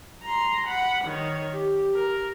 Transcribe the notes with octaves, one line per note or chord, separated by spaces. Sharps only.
A#5 C6
F#5 B5
D#3 C#5
G4
A#4